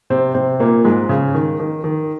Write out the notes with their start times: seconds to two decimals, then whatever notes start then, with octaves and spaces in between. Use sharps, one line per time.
0.10 C3 C4
0.35 C3 C4
0.60 A#2 A#3
0.85 G#2 G#3
1.09 C#3
1.34 D#3
1.60 D#3
1.84 D#3